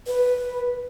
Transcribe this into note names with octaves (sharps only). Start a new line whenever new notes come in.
B4